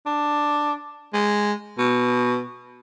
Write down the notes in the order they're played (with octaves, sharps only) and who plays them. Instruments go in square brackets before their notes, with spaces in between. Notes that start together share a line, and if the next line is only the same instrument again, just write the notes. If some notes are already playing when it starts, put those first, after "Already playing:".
[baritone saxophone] D4
G#3
B2